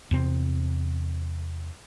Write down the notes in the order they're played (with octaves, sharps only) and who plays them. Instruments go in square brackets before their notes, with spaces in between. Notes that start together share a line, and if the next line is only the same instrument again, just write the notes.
[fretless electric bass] E2 C3 C4